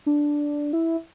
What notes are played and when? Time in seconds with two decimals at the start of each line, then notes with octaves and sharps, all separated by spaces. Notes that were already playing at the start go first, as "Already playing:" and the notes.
0.06 D4
0.73 E4